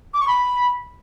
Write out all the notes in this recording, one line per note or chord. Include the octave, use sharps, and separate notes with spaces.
D6
C#6
B5